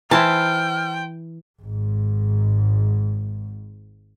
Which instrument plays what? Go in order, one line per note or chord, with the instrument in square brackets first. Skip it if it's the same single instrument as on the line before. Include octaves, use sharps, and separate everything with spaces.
[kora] E3 E4 [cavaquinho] C5 A5 [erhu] G5 [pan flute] F6
[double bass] G#1 G#2